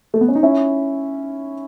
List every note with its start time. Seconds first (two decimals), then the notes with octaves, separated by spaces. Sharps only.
0.14 A3
0.21 B3
0.28 C#4
0.35 D#4
0.43 C#4 E4